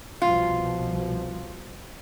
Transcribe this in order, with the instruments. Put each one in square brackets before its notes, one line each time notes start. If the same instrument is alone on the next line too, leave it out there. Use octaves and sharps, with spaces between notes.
[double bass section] C2 B2 F3 [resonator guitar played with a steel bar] F4